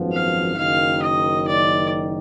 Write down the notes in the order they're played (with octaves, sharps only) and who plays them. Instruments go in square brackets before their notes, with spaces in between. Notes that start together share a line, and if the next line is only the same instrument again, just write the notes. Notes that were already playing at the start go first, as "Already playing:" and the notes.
Already playing: [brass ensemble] G#1 F#2 F3 B3
[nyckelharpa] F5
[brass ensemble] F#1 F#2 D#3 [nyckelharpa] F5
[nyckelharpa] D#5
D5